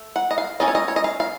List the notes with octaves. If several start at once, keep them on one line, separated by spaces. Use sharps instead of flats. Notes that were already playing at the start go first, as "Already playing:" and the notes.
Already playing: A3
F#5
D#5
F5
A3 C#4 F4 D#5
C#5
D#5
C#5
D#5
F5
F5